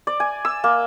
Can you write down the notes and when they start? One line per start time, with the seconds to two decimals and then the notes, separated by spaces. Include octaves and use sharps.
0.07 D5
0.20 G#5
0.45 E6
0.64 A#3